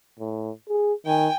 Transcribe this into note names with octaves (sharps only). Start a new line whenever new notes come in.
A2
G#4
D#3 G5 G#5